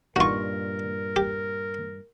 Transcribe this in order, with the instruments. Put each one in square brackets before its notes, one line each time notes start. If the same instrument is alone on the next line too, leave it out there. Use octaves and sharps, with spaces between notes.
[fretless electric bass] G2 A#2 [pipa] D#4 C#6 [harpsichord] F4 F#4 [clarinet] A#4
[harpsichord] G4